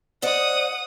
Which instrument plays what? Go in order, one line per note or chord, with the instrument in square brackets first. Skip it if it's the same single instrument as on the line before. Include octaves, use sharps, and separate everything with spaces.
[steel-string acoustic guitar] C5 D5 D#5 [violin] F#5 D#6